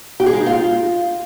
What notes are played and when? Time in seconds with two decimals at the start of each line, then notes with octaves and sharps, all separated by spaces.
0.20 G4
0.26 G#4
0.33 G#3
0.40 D#4
0.46 F4